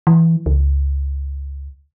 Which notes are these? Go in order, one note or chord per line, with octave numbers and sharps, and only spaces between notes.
E3
C#2